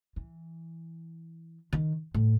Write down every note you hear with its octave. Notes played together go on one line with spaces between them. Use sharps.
E3
D#3
A2